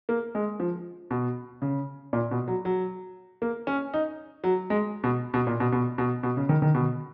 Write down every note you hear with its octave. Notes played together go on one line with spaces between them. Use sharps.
A#3
G#3
F3
B2
C#3
A#2
B2
F#3
F#3
A#3
C#4
D#4
F#3
G#3
B2
B2
A#2
B2
B2
B2
B2
C#3
D#3
D#3
B2